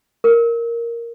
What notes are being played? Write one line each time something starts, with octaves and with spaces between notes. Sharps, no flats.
A#4